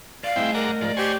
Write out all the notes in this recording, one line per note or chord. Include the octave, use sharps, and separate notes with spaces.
D5 F5
G2 A3 C4 E4 G#4 D#5 G5
A#4 D5 F#5 A#5
G#2 F3 D5
G4 C5 C#5 G#5